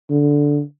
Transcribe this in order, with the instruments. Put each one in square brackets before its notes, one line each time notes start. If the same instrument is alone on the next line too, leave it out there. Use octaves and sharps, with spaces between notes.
[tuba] D3